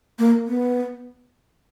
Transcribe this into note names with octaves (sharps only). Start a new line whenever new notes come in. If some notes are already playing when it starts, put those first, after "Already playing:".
A#3
B3